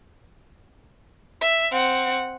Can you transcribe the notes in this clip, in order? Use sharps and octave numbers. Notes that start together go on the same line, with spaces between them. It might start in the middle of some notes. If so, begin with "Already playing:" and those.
E5
C4 F#5